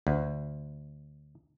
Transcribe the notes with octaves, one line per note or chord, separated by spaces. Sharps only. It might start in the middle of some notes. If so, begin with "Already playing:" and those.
D2